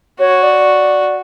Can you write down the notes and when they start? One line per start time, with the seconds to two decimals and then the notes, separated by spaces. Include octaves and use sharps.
0.19 F#4 C#5
0.43 D5